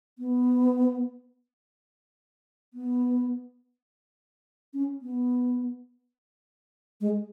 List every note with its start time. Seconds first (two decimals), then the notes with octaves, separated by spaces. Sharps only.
0.19 B3
2.74 B3
4.74 C#4
5.02 B3
7.01 G#3